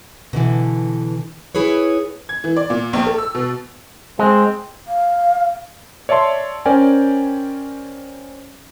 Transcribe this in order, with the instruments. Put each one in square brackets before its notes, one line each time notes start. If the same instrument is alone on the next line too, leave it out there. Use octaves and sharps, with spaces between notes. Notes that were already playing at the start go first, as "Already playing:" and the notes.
[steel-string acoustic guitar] B2 D3 E3
E4 G#4 B4 C#5
[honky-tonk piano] G#6
E3
D5
A#2
A#1
A4
E6
B2
[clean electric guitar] G#3 [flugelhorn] C4
[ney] F5
[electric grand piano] C#5 D5 E5 A5 C6
C#4 A#4 C5 D5 G5 G#5